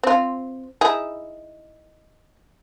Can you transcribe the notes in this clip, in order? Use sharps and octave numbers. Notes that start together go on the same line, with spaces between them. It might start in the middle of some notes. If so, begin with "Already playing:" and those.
C4 F4
D#4 E4 G#4